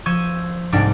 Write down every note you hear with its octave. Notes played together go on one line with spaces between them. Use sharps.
F3 C#6 E6 G6 G#6 D#7
C2 G#2 G3 D4 D7